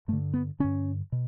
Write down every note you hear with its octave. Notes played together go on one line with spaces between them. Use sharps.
G2 D3 A3
B3
G2 D3 C#4
B2